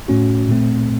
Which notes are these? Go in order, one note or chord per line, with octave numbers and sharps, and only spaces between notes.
A2 A3 C#4 F#4
A#2 A3 C4